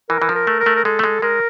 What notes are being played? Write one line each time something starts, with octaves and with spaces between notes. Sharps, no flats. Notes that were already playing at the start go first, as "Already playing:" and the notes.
E3 A#4
E3
F3
A#4
A3
A#4
A3
A#4
G#3 A4
A3
G#3
G#3 A#4